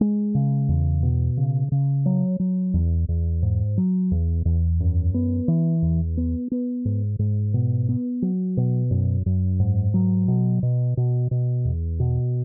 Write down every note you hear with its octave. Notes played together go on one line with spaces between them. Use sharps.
G#3
C#3
E2
B2
C#3
C#3
F#3
F#3
E2
E2
G#2
F#3
E2
E2
F#2
B3
E3
E2
B3
B3
G#2
G#2
B2
B3
F#3
B2
F#2
F#2
G#2
F#3
B2
B2
B2
B2
E2
B2